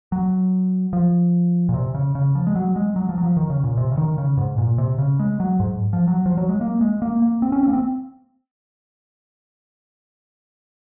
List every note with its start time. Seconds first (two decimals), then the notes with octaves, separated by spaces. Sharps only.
0.12 F#3
0.93 F3
1.69 A#2
1.74 C3
1.94 C#3
2.15 C#3
2.35 F3
2.47 G#3
2.55 F#3
2.76 G#3
2.96 F#3
3.09 F3
3.18 F#3
3.23 F3
3.37 D#3
3.50 C#3
3.64 A#2
3.77 C3
3.92 C#3
3.97 D#3
4.18 C#3
4.37 G#2
4.58 A#2
4.78 C3
4.98 C#3
5.19 G#3
5.40 F#3
5.60 G#2
5.93 F3
6.08 F#3
6.26 F3
6.37 F#3
6.49 G#3
6.61 A#3
6.81 G#3
7.02 A#3
7.22 A#3
7.42 C4
7.52 C#4
7.63 C4
7.68 A#3
7.73 C4